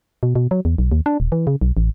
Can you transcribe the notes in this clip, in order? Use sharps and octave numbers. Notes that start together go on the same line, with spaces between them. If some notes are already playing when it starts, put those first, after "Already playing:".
B2
B2
F#3
E2
B1
D#2
D4
D#1
E3
C#3
B1
A1